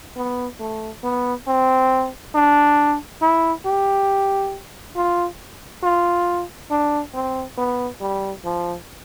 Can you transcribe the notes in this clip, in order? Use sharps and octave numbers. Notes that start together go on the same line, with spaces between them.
B3
A3
B3
C4
D4
E4
G4
F4
F4
D4
C4
B3
G3
F3